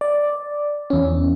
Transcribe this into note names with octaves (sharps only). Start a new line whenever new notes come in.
D5
E2 C#4